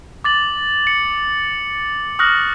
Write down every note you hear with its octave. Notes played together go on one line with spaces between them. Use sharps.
D6 A6 F#7
C#7
C#6 D#6 F6 F#6 A#6 F#7